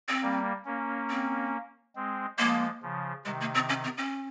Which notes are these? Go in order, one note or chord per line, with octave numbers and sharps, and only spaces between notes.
C4
G3 A#3
A#3 C#4
C4
G#3 C4
F3 G#3 A#3
C#3 F3
C3 D#3 G#3
A#3
C4
C#4
C4
C#4